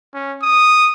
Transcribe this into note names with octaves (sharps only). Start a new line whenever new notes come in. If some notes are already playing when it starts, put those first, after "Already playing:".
C#4
D#6